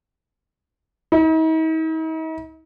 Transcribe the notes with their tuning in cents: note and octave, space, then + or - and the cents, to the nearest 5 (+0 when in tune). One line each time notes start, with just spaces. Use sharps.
D#4 +45